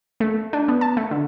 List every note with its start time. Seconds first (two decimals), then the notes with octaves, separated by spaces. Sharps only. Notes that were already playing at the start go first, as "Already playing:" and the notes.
0.20 A3
0.53 D4
0.68 B3
0.81 A5
0.97 A3
1.11 D3